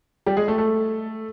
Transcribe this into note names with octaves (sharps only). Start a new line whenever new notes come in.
G3 G4
G#3 G#4
A3 A4
A3 A4